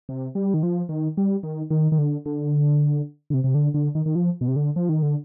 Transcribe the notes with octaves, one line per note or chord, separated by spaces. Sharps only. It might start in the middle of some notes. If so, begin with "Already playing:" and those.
C3
G3
D#3
F3
D#3
G3
D#3
D#3
D#3
D3
D3
D3
C3
C3
D3
D3
D#3
D#3
F3
B2
C3
D3
F3
D#3
D3